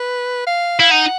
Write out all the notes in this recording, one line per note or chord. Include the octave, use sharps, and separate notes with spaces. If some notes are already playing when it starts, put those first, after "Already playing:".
Already playing: B4
F5
E4 F5
D#4 F#5